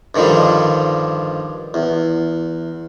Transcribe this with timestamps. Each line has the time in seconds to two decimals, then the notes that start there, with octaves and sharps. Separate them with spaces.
0.15 G2 D3 D#3 F3 G3
1.74 E2